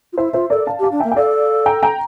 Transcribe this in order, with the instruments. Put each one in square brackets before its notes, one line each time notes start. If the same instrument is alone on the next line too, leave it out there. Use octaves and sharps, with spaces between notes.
[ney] F4
[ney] E4 [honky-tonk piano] C5 E5
[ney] F4 [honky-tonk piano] C5 E5
[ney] A4 [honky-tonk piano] A#4 D5
[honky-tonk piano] F5 A5
[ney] G4
[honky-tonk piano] F5 A5
[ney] D4
[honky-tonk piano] E5 G5
[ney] A#3
[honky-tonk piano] G5
[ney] A4 [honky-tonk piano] D5 F5
[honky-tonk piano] G5 A#5
G5 A#5